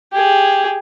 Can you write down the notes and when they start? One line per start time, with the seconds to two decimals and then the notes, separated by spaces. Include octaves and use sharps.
0.12 G4 G#4